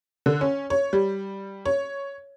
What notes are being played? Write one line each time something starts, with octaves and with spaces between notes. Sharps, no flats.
D3
C#4
C#5
G3
C#5